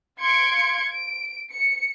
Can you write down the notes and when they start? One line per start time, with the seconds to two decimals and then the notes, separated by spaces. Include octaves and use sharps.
0.21 F5 C6 G#6 C#7 D7
0.88 D7
1.52 C#7